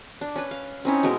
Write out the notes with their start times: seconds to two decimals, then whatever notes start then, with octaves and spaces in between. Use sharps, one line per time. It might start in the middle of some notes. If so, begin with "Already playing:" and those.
0.21 D4
0.36 C#4 B4
0.51 F5
0.85 C4 C#4 D#4 E4
1.03 B2 G#3 A#4